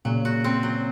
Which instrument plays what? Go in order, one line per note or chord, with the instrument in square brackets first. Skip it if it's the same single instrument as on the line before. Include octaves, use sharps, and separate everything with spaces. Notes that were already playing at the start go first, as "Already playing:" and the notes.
[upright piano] A#2 C#3 [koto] F#3
[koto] F#4
C4
F#3